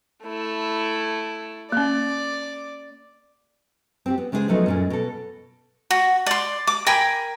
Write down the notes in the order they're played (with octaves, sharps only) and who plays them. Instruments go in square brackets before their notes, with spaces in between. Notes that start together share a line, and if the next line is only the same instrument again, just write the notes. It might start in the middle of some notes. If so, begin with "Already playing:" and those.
[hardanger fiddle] A3 E4
[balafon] A#3 C#4 [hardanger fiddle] D5
[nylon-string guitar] C4 F#4 G4
B3
C#3 G#3 D4 E4 G#4 C5
F3 F#3 A3 B3 D#4
F#2 A#2 C#4
B2 A4
[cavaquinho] F#4
D5 C6
D6
A#4 G5 G#5 B5